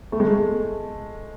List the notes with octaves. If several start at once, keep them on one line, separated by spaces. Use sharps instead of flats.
A3
G#3
A3